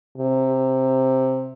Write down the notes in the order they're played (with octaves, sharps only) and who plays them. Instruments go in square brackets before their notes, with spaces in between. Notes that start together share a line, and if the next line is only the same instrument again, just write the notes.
[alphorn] C3